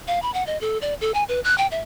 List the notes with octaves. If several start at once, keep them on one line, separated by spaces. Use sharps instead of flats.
F5
B5
F#5
D#5
A4
D5
A4
G#5
B4
F#6
G5
E5